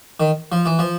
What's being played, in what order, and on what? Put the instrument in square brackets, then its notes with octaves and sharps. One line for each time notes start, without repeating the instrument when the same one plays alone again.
[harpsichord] D#3
F3
E3
F3